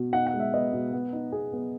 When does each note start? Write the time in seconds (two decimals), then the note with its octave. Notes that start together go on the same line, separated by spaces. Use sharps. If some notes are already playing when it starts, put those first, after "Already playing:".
Already playing: B2
0.13 D#4 F#5
0.27 F#5
0.34 G#3
0.40 E5
0.53 B3 D#5
0.73 B2
0.93 B3
1.13 D#4
1.32 B3 G#4
1.53 B3